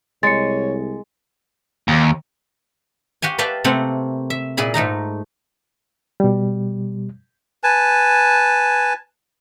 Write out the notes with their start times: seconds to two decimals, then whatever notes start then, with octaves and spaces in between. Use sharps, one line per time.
0.23 C2 G#3 C#5 A6 C#7
1.88 D#2
3.22 F#4 G4 F5 G#5
3.38 B4 D5 E5 F5 G5 A5
3.64 C3 A3 A#3 C4 F5 F#5
4.30 E5
4.57 A#2 E4 G#4 B5
4.74 G#2 A3 D#4 A#5
6.20 B2 G3
7.64 B4 G#5 A5